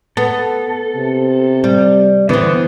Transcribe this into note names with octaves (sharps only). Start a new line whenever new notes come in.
B3 A4
C3
G3
D3 E3 B3 C4